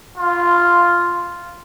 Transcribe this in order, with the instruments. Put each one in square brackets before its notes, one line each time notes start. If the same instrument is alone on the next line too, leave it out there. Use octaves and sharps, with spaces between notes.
[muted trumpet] F4